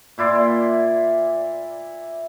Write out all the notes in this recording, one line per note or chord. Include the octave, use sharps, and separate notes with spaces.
A#2 E4 D5 C6